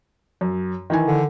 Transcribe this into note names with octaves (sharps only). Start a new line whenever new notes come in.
F#2
D#3 E3 G#5
D3